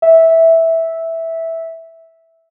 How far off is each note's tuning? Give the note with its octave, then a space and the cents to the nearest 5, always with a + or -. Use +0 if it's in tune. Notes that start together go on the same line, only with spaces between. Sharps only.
E5 -10